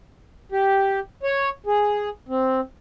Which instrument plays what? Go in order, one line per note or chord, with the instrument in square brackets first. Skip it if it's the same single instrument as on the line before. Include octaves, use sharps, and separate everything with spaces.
[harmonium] G4
C#5
G#4
C4